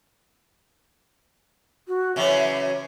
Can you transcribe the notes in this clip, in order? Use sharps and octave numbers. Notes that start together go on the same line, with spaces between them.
F#4
C#3 E3 F#3 E5